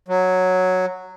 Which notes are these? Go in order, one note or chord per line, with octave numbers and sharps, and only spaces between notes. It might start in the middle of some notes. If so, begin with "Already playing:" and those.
F#3